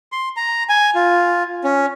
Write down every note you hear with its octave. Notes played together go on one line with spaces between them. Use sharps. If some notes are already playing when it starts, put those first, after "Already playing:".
C6
A#5
G#5
F4
C#4